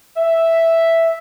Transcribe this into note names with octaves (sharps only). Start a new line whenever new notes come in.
E5